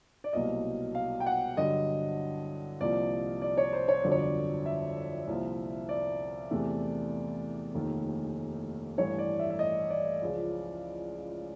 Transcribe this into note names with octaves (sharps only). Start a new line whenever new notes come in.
D5
C2 B2 F#3 A#3 D#5
F5
G5
F#5
G2 D3 F#3 D#5
C2 C3 F3 A#3 D5
D5
C#5
C5
C#5
G1 F2 D3 F#3 D5
C#5
D5
E5
C2 A#2 F3
D5
E2 C3 E3 A3
F1 D#2 D#3
A1 G2 E3 A3 C#5
D5
E5
E5
D#5
D5
C#2 C#3 F3